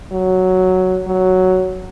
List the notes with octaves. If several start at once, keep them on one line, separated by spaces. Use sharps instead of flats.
F#3
F#3